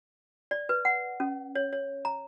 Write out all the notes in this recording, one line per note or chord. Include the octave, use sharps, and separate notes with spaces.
D5
B4
F#5
C#4
C#5
C#5
A#5